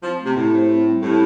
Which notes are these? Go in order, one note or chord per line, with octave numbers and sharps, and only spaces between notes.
F3 C4
A3
C3
A2 G4
C5
C4
G3
A2 G4